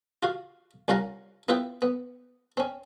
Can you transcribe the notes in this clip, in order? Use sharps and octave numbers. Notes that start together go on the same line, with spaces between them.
F4 F#4 F5
C2 C#4 F4 F5 F#5 A#5
B3 E4 F4 B4 E5 G5
B3
C4 C#4